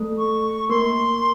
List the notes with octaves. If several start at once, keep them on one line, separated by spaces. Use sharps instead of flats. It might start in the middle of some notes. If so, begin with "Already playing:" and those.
Already playing: A3 A4
C#6
A#3 A#4 C6